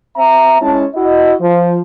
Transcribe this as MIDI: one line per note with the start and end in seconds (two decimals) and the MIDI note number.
0.16 0.60 60
0.16 0.60 76
0.16 0.60 82
0.61 0.84 56
0.61 0.84 61
0.61 0.84 64
0.61 0.84 81
0.95 1.34 64
0.95 1.34 66
0.95 1.34 75
1.41 1.79 53